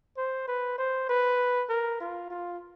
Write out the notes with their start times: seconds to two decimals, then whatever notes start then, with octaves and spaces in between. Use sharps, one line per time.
0.17 C5
0.48 B4
0.78 C5
1.09 B4
1.69 A#4
2.01 F4
2.31 F4